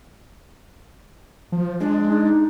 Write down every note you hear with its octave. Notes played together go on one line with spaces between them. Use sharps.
F3
G#3 D4
D#4